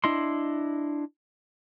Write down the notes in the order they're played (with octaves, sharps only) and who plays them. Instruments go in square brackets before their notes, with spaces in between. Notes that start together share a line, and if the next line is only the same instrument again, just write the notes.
[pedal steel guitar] D4 E4 D#5 C6